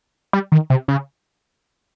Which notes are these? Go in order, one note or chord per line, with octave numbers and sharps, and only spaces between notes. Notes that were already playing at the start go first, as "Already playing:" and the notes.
G3
D#3
C3
C#3